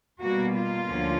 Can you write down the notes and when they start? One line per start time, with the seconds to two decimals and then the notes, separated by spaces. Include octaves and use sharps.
0.20 B2 G3 A#3 F#4
0.53 F4
0.86 D2 D3 F3 A#3 C#4